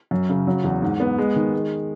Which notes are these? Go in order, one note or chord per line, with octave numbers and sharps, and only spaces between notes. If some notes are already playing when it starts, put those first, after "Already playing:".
F#2
C#3
F#3
E2
G#2
B3
G#3
D#3
G#3